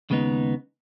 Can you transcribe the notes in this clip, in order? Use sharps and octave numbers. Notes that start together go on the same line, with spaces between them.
D#2 C#3 G#3 B3 D#4